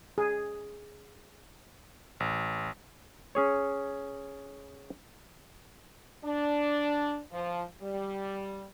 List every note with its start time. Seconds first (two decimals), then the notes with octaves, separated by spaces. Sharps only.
0.18 G#4
2.20 A1
3.35 C#4 G#4 C#5
6.25 D4
7.32 F3
7.82 G3